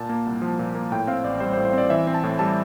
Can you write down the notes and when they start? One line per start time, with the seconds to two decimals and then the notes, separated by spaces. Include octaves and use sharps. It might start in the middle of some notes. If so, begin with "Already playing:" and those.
Already playing: A#2 A5
0.09 A#3
0.26 C2
0.42 F3
0.59 A#2
0.75 A#3
0.92 A2 G5
1.07 C4 F5
1.24 A1 D5
1.40 G3 C5
1.53 C5
1.57 A2
1.65 C5
1.73 C4 D5
1.90 E3 E5
2.07 C4
2.14 A5
2.23 A2
2.39 G3 A5